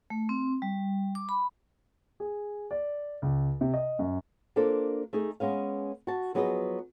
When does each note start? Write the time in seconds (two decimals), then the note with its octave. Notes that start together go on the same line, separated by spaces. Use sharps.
0.10 A3
0.29 C4
0.62 G3
1.15 D6
1.29 B5
2.20 G#4
2.71 D5
3.22 C#2
3.61 C3
3.74 D#5
3.99 F#2
4.56 A#3 D4 F4 A4 C5
5.13 A3 D#4 G#4
5.40 G#3 B3 C#4 F5
6.07 F#4 A5
6.34 F3 F#3 B3 G#4 B4 D#5